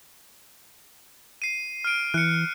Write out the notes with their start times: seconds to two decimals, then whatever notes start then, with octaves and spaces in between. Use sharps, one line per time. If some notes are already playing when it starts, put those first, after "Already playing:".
1.42 C7 D#7
1.84 F6 D7
2.14 E3 F#6 C#7